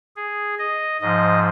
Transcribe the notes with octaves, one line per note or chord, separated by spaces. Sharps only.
G#4
D#5
G#2 F3 D#5